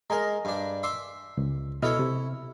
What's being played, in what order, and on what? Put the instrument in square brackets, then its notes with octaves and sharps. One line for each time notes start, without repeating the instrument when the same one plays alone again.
[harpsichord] G#3 A#4 [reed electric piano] D#5 G#5 A#5
[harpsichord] G2 D4
E5 C6 D6
[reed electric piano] C#2
[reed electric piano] B2 D#5 F6 [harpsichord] E4 A4 C#5
[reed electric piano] C3